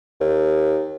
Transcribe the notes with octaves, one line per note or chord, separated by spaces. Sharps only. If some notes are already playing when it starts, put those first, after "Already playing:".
D#2